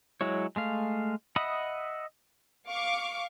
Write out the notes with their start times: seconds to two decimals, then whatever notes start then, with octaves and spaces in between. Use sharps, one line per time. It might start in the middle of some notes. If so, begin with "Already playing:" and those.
0.21 F#3 G#3 E4 C#5
0.56 G#3 A3 F5
1.36 D#5 E5 F#5 B5 D#6
2.68 F5 C#6 D6